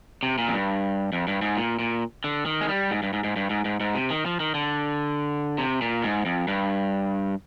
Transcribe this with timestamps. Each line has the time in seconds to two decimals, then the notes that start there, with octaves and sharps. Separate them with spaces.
0.23 C3
0.38 A#2
0.48 F2
0.54 G2
1.13 F2
1.28 G2
1.42 G#2
1.57 A#2
1.79 A#2
2.24 D3
2.46 D#3
2.61 G#3
2.68 G3
2.91 G#2
3.03 G2
3.13 G#2
3.24 G#2
3.36 G2
3.50 G#2
3.65 G#2
3.80 G#2
3.95 C3
4.10 D#3
4.26 F3
4.40 D#3
4.54 D3
5.58 C3
5.82 A#2
6.04 G#2
6.26 F2
6.48 G2